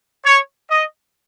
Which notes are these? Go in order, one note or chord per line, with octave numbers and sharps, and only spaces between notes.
C#5
D#5